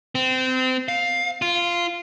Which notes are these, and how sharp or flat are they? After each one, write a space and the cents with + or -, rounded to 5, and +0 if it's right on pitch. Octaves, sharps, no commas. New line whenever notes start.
C4 -25
F5 +10
F4 -10